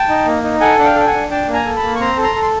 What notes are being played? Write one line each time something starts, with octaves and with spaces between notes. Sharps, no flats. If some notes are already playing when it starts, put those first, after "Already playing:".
Already playing: G5 A5
D#4
A#3
D#4
A4 F#5 G#5
D4 F#5
F5 G5
A4 G5
F#5 G#5
D4
D4 G5 A5
A#3
G#5 A#5
A4
A5 B5
A#3
C#6
C4 A#5 C6
A4
A#5 C6
A4
C6